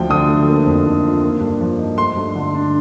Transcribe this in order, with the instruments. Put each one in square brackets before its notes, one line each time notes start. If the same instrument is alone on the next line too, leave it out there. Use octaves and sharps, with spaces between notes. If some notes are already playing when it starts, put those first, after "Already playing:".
Already playing: [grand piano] D2 F3 G5
D3 D#6
A3
A#3
F2
D#3
F4
A#3
G2
F3
D#4
A3 C6
G2
D3
D4